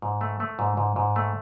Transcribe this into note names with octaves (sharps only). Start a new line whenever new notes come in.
G#2
A3
A3
G#2
G#2
G#2
A3